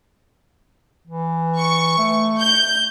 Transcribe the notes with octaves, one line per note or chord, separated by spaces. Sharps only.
E3
C#6
A3
G6